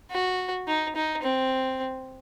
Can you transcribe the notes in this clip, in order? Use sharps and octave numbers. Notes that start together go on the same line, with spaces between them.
F#4
D#4
D#4
C4